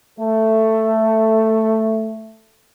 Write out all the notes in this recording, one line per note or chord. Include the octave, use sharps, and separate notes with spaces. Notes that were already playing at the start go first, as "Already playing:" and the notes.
A3 A4